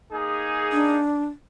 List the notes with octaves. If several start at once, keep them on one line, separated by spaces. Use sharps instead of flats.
A#3 D#4 G#4
D4